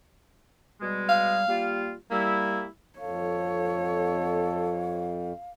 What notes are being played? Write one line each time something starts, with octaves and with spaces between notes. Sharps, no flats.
B2 G3 G#3
F5
G3 A#3 F4
G3 A#3 E4
F2 A4 C#5 F5